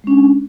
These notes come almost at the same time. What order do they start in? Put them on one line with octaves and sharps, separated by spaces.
G#3 C#4 D4